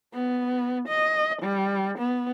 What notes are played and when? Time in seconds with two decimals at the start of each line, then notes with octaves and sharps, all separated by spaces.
0.14 B3
0.88 D#5
1.42 G3
1.99 B3